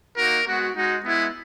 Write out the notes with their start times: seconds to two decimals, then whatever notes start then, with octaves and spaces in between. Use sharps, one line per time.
0.18 A#3 D#4 F#4 A#4
0.47 G#3 B3 F#4
0.75 G#3 D#4 F#4
1.03 G#3 B3 E4